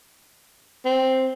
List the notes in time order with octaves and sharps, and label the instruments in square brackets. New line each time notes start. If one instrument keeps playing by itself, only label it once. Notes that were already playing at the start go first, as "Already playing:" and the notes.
[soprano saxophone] C4